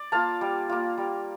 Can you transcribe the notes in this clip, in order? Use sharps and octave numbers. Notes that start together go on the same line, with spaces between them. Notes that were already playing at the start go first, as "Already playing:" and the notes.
Already playing: D5
A#3 F4 F5 A5
G3
A#3 F4
G3